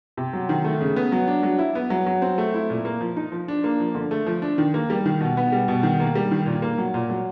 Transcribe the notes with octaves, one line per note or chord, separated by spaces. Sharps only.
C3
F#3
D#3
A3
C#3
B3
F#3
D4
F#3
E4
B3
F#3
F#3
C4
A3
E4
A#2
A#3
F3
D#4
F3
D4
A#3
F3
D3
A3
F3
D4
D#3
A#3
G3
D#3
B2
B3
G3
B2
D#3
A#3
G3
D#3
A#2
A#3
F#3
A#2
F#3